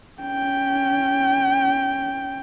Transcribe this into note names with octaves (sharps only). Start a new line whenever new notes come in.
C#4 G5